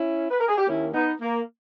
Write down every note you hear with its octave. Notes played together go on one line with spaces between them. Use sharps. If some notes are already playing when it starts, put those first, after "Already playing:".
Already playing: C#4 E4
B4
A#4
G#4
G4
D#2 D#3 A#3 C#4 E4
B3 D#4
A#3